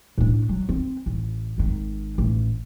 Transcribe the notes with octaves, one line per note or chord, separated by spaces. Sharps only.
A2 D4
F#3
C4
A1
G#1 D#3
A1